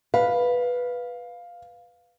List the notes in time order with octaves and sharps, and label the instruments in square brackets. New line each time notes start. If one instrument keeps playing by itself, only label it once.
[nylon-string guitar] B4 [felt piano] F5